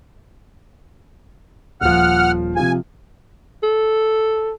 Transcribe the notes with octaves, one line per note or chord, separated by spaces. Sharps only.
D#1 F3 F#5 F6
C3 F3 G#5
A4